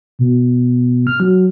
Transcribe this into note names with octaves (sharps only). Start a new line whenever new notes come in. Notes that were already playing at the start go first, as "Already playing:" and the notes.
B2
F6
F#3